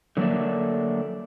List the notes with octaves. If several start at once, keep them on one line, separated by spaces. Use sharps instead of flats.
D3 F#3 A3 A#3 D4 A4